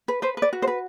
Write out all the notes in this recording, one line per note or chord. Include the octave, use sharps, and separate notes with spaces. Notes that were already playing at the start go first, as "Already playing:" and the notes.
B4
B4 C5
B4
D5
F#4
C5
B4